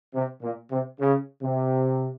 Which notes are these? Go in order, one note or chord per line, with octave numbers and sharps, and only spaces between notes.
C3
A#2
C3
C#3
C3